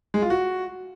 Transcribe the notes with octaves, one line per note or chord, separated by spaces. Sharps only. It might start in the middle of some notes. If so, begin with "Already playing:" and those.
G#3
F4
F#4